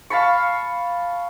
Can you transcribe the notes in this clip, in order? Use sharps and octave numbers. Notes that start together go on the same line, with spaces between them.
F5 A5 B5 C#6